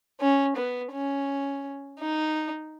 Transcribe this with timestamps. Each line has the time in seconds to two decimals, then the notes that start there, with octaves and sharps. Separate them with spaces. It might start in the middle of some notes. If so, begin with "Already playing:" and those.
0.20 C#4
0.56 B3
0.92 C#4
2.00 D#4